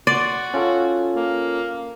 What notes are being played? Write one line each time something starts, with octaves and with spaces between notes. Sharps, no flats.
F#4 D5 C6
C#4 F4 A4
A#3